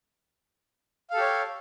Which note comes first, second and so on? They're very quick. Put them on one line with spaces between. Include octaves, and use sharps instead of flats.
F5 A4 G4 C#5